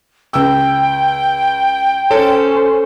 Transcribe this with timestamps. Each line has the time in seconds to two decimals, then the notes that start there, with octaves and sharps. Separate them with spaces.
0.33 C#2 G5 E6
2.11 C#4 A4 C5 C#5